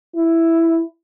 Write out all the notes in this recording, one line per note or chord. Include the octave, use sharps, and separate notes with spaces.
E4